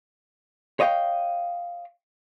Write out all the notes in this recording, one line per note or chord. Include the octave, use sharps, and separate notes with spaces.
C#5 D#5 F5 G5